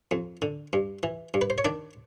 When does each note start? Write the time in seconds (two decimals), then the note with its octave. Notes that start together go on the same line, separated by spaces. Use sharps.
0.11 F2
0.42 D3
0.73 G2
1.03 E3
1.34 G2
1.41 B4
1.50 C5
1.58 C#5
1.65 D#3 D4 D5